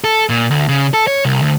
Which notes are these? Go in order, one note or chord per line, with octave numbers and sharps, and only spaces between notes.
A4
A#2
D2
C#3
A4
C#5
C2
D2